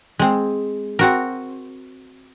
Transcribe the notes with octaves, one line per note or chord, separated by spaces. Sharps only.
G#3 C4
C4 F#4 A#4